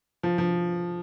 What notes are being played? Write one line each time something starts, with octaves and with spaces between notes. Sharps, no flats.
F3
F3